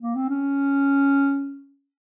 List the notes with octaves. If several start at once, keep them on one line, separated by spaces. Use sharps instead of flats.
A#3
C4
C#4